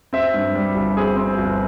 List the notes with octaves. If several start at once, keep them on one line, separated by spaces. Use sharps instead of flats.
C4 E5
G2
G3
G1
C4 G#4
C4
G1